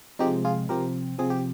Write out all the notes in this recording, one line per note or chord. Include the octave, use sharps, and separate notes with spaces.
C3 F3 G#3 C4 D#4 G4
F4 G#4
C3 F3 C4 G4 A#4
C3 F3 C4 G#4
G4